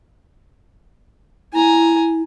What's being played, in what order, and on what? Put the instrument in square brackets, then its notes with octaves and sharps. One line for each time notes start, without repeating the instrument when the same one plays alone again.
[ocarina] E4 [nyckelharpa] G#5 A#5